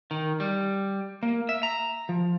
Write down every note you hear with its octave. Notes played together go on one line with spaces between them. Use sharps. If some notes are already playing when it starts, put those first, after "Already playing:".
D#3
G3
A#3
E5
A#5
F3